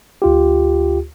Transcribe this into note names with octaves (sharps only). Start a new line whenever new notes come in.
D2 F4 G4